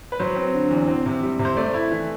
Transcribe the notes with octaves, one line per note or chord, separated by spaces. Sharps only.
B4
F#3 C5
C4
D3
E2
C4
C3
G3
C3
C5
A3 D5
E4
E3